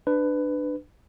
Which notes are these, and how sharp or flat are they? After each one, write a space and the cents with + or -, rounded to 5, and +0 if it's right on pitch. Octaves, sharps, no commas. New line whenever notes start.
D4 +20 B4 +15